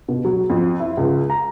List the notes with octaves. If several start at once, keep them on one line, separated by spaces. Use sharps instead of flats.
B2
F#3
F2
E4
C#2
A#5